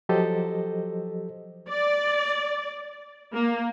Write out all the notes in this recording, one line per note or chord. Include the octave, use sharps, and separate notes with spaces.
F3 F#3 G4 A4 C5 D#5
D5
A#3